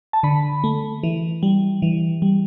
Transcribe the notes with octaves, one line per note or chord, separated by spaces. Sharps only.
A5
D3 B5
A3
E3
G3
E3
G3